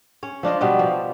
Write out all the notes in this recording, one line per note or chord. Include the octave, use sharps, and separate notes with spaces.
C#4 C#5
F3 D4 F4 D#5
B2 G3 B3 D4
F3